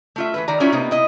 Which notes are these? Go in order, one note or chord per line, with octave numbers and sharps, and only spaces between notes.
A3 F4 E5
E3 A3 B4
D#3 D5 A#5
G3 C#4 E4 F4 C#5 D5
C3 A#3 B3 D#4
E4 D#5